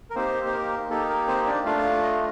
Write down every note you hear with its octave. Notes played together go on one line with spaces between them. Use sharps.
A#4
A#3 C4 D#4 G4 C5
C5
A#4
A#3 D#4 G4 A4
A#4
C4 C5
D4 D5
A3 D4 F4 F5
D#5
F5